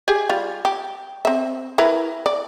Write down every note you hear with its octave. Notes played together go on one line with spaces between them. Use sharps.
G4 G#4 G#5
G3 F4
G4
C4 E5
E4 A#4 B4
D5